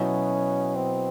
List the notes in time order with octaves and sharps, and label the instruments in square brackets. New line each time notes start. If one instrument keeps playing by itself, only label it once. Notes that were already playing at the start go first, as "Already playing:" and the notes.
Already playing: [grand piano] B2 F#3 B3 E4 [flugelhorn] C#4
[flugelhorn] C4